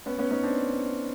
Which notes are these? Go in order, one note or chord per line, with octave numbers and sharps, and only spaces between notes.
B3 C#4
B3 C#4
C#4 D#4
C4 D4